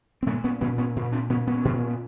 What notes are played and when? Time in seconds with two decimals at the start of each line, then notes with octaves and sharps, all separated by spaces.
0.23 C4
0.27 A#2 A3 B3
0.44 B3 C#4
0.61 A#2 B3 C#4
0.78 B3 C#4
0.96 A#2
1.12 C4 D4
1.30 A#2 B3 C#4
1.47 B3 C#4
1.65 A#2